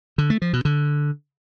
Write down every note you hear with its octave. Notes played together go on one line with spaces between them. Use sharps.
D3
A3
F3
B2
D3